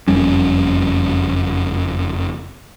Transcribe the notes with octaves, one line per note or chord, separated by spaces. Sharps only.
F#1 F2 G3 C#4